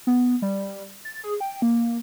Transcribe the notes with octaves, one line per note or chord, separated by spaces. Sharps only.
B3
G3
A6
G#4
G5
A#3